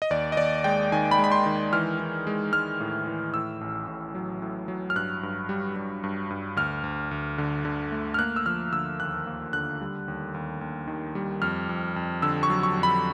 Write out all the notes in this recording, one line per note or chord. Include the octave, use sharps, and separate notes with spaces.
D#5
D#2 D5
D#5
D#2 D5
G#3 G5
D#3 G#5
B5
G#3
B5
C6
D#3
E3 F6
E3
G#3
G#3 F6
A2
E3
A2 E6
A1
A2
F#3
A2
F#3
F6
G2 F#6
G2
G3
G3
G2
G2
D2 F6
D2
D2
D3
D3
A3
F6
A#3 F#6
E6
F3 F6
D3 E6
D#2 F#6
A#3
D3 F#6
G3
D#2
D#2
D#2
D#3
G3
F2 F6
F2
F2
D3 E6
C#6
F#3
C#6
F2
B5